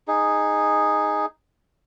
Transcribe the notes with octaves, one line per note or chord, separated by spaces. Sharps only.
D#4 G#4